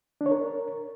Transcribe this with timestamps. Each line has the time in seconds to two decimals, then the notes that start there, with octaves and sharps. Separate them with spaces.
0.21 D4
0.26 C#5
0.31 A#4